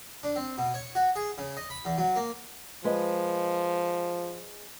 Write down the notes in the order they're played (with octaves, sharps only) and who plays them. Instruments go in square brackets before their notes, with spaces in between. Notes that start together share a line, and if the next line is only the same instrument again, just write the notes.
[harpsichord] D4
C4
B2
C#5
F#4
G#4
C#3
D#5
B5
E2
F#3
A#3
[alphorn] F3 [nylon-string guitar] G#3 B4 D#5